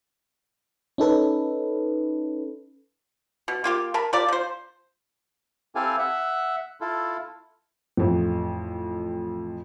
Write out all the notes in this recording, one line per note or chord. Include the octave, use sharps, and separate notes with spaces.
C#4 D#4 A4 B4
B2
A#3 F4 G4
A#4 A5 B5
F4 G4 A#4 D5
F3 C5
C4 E4 G4 A4 F5 G#5
E5 F#5
E4 F4 A4
A1 F2